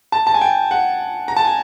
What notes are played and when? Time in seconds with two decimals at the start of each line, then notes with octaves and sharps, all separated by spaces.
0.12 A5
0.27 A5
0.34 G#5
0.41 G5
0.71 F#5
1.28 A#5
1.36 A5
1.45 G#5